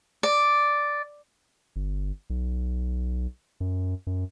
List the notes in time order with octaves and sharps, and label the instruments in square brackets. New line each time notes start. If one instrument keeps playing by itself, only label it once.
[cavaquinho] D5
[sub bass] G1
B1
F#2
F#2